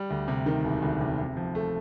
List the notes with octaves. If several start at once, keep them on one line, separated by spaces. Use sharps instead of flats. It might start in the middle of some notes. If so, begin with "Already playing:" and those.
Already playing: G3
D2
C3
D#3
E1
D2
C3
C3
F3
A3